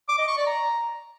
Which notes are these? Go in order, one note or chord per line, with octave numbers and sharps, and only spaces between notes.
D6
D#5
C#6
D5
A#5